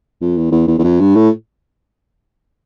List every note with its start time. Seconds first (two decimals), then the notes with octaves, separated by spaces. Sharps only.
0.21 F2
0.37 E2
0.52 E2
0.67 E2
0.78 E2
0.84 F2
1.00 G2
1.15 A2